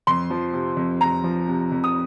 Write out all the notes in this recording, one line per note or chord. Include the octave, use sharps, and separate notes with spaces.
F2 C6
F3
C3
F2
F2 A#5
F3
C3
F2
D#6